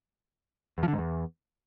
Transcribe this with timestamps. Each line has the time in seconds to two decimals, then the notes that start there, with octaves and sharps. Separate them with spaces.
0.78 E2
0.83 F3
0.88 D3
0.93 G#2
0.98 E2